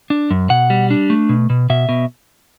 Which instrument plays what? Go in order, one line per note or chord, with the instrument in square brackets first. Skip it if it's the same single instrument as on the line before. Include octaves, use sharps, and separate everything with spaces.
[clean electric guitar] D4
F#2
B2 F#5
G3
D4
A3
B2
B2
B2 E5
B2